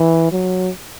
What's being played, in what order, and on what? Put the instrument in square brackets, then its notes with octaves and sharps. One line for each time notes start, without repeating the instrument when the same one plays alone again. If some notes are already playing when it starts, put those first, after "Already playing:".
Already playing: [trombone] E3
F#3